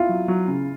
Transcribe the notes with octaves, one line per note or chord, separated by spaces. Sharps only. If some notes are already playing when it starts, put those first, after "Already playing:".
Already playing: E4 F4
F#3
F#3
C#3